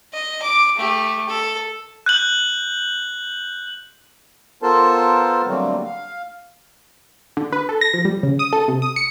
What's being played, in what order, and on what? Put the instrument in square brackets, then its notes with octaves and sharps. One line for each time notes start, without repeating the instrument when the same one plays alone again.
[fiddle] D#5
D6
A3 G4
A4
[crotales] F#6 G6 F#7
[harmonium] B3 F4 A4 A#4 C5 A5
D3 F#3 G3 A3 A#3 C4
F5
[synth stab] D3
B4
A4
A#6
F3
G3
C#3
D#6
A4
C3
D#6
C#7